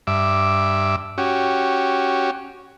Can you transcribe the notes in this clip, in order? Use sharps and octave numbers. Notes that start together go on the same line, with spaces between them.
G2 E5 D6
C#4 F#4 G4